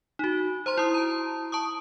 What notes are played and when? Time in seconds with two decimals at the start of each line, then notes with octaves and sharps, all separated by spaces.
0.19 D#4 F#4
0.66 C5 A#5 C6
0.78 E4 D#6
0.94 A5 A#5
1.52 A5 C#6 D#6